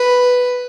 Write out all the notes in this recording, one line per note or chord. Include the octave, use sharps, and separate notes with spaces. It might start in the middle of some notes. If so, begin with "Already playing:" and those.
Already playing: B4